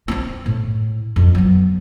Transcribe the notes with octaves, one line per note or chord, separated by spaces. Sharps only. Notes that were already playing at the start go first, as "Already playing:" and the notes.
B3 C4
A2
F2
F#3 B3